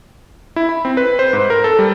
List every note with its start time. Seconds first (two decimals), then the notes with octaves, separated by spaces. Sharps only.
0.56 E4
0.69 B5
0.85 C4
0.97 B4
1.19 C5
1.33 G#2
1.50 A#4
1.64 A4
1.79 G3